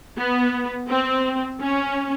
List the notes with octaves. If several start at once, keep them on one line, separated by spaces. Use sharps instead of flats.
B3
C4
C#4